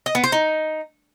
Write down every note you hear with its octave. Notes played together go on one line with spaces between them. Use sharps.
D#5
B3
C5
D#4